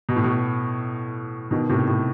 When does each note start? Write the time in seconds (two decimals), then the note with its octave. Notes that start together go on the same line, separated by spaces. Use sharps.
0.09 B2
0.16 A2
0.24 B2
1.51 B2 D#3
1.69 A2 C3
1.87 A2